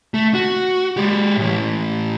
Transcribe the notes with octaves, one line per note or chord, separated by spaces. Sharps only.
A3
F#4
G#3 G4
A2 E3